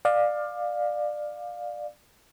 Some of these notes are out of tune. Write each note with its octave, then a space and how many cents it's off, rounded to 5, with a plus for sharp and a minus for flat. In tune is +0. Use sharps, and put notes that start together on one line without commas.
D5 +20 F5 +15